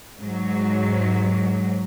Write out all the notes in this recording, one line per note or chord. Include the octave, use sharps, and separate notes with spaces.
G#2 F#3